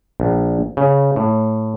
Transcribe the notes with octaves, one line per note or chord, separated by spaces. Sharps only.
A#1
C#3
A2